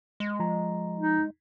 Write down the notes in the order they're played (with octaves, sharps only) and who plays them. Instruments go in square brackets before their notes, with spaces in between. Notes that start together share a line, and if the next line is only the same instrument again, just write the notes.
[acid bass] G#3
[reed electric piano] F3 A#5
[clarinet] D#4